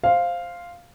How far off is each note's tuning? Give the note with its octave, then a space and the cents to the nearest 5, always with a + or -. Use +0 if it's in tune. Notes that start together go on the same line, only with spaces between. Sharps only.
C5 +0 F5 +0